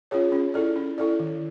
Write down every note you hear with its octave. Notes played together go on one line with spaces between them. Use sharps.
C#4 F4 G#4 C#5
C#4
E4 A4 D5
C#4
E4 A4 D5
D#3